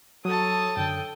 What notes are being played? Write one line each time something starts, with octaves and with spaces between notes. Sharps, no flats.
F#3 A4 C#5 A5 D#6
F#2 D3 A4 G5